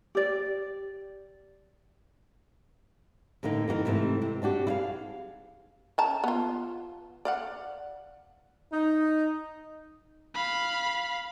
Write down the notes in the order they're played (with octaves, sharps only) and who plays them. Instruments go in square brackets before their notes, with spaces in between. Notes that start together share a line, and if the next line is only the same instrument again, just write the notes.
[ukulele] G4 D5
[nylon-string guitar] A2 D3 A#3 D#4
E3 D#4 F#4 A#4
G#2 C3 E3 A3 C4
C3
C4 D4 F#4 G4
E4 G#4 F5
[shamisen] C#3 A5 A#5
B3 F4
D5 F5 F#5
[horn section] D#4
[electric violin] F5 B5